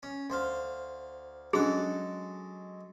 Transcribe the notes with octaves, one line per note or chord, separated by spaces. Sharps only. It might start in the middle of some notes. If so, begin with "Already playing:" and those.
C#4
D2 C5 F5
F#3 G#3 C#4 D4 G#4 A4 F#6